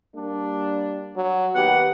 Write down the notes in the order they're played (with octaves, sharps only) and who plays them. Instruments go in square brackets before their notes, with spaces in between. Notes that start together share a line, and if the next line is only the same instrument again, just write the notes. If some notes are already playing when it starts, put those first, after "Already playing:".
[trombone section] G3 A#3 D4
[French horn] F#3
[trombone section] D#3 A#3 G4 [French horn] B3 [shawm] F#5